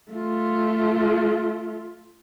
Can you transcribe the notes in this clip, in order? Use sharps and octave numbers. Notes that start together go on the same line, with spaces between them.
A3 F4